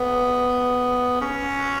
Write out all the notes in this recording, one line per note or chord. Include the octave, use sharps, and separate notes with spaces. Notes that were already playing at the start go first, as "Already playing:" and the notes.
Already playing: B3
C#4